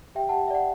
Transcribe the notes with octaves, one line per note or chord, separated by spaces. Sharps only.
G4 E5 G5
G4 F#5 A5
E5
D5 F#5